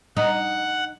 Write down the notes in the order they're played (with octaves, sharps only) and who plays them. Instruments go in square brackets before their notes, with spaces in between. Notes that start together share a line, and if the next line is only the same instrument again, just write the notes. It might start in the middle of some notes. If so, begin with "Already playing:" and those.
[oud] D#4 [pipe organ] F#5